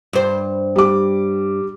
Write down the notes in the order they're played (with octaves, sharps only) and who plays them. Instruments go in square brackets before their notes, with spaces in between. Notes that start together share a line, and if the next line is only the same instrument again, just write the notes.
[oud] G2 C5
[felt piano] G3 D6